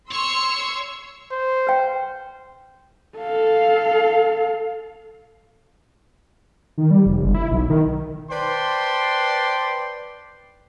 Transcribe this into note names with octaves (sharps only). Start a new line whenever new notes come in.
C#5 C6 C#6 E6
C5
B4 G5
A4 F5
D#3
G3
F1
G1
E4
B1
D#3
B4 C5 D5 G5 A5 C6